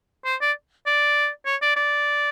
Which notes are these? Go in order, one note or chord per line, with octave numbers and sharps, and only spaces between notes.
C5
D5
D5
C#5
D5
D5